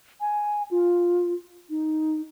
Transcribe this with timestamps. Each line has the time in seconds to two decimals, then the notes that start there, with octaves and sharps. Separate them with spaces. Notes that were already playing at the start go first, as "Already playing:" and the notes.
0.21 G#5
0.71 F4
1.70 D#4